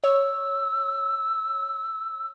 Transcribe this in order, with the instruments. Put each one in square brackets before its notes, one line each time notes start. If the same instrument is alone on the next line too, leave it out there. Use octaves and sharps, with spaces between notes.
[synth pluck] C#5 [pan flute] E6